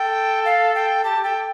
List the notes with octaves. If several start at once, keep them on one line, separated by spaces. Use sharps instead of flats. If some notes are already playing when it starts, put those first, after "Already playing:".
Already playing: A4 G5
F5
G5
G4 A5
G4
A4 G5